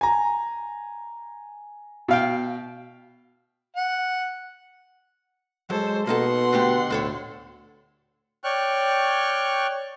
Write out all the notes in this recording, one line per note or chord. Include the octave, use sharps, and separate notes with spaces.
G#5 A#5
B2 F5 G5
F#5
F#3 G#3 A4 C5
B2 A#3 D#4 A4 F#5 C6
D3 A3 G4
D2 A2 A4 C#5
C#5 D5 G5 C#6 F6 F#6